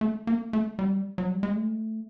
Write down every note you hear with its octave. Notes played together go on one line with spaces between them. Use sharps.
A3
A#3
A3
G3
F#3
G3
G#3
A3